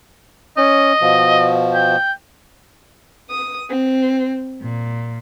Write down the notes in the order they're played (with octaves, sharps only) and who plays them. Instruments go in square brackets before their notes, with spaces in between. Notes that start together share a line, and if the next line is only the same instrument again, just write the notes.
[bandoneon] C#4 [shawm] D#5
[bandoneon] B2 F3
[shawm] G5
[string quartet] D#6
C4
A#2